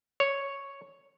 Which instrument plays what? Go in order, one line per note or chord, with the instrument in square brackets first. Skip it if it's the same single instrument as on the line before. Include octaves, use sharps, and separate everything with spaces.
[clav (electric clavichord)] C#5